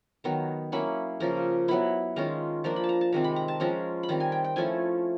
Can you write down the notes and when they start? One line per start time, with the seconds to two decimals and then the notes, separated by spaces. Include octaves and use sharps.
0.24 D#3 F#3 B3 A#5
0.72 F#3 A#3 C#4 E4 B5
1.20 C#3 F3 A#3 A#5
1.68 F#3 B3 E4 B5
2.16 D#3 G#3 C#4 F4 A#5
2.64 F3 A#3 D4 A#5
2.76 B5
2.84 A5
2.89 A#5
3.01 A5
3.12 C3 D#3 G#3 C4 A#5
3.24 B5
3.36 A#5
3.48 A5
3.60 F3 G#3 C#4 A#5
4.03 B5
4.09 D#3 G3 C4 A#5
4.20 G#5
4.32 G5
4.44 G5
4.56 F3 A3 C#4 E4 G#5